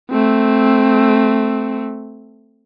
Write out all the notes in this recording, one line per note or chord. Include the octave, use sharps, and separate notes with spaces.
A3 C4